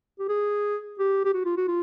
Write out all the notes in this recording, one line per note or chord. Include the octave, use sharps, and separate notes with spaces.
G4
G#4
G4
G4
F#4
F4
F#4
F4